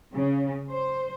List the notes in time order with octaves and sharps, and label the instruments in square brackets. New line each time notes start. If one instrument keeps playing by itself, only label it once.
[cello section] C#3
C5